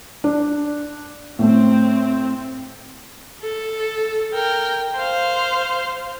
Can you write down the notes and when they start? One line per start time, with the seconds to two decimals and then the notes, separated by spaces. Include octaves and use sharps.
0.24 D4
1.39 A2 A3 C4
3.43 A4
4.33 A#4 G5
4.96 C5 F5